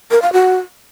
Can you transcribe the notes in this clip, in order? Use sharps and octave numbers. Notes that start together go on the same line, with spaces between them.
A#4
F5
F#4